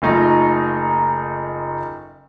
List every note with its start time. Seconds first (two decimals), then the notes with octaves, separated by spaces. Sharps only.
0.02 F#1 A3 D#4 F4 A#5